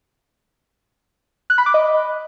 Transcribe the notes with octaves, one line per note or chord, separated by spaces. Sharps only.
F#6
B5
D6
D#5